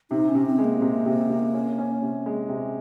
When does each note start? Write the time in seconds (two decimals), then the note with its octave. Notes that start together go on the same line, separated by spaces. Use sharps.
0.11 C3 D#4
0.29 C#4
0.35 C3
0.46 C4
0.59 G#3
0.64 A#3
0.82 C3
1.06 C3
1.30 C3
1.54 C#4
1.79 C#4
2.02 C3
2.26 G#3
2.49 C3